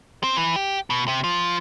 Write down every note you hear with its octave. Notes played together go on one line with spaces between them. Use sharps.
C4
E3
G4
B2
C3
F3